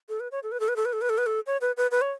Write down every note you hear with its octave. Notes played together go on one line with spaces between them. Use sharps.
A4
B4
C#5
A4
B4
A4
B4
A4
B4
A4
B4
A4
B4
A4
C#5
B4
B4
B4
C#5